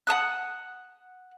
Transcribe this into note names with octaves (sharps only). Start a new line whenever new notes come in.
F#5 A5 D#6 F#6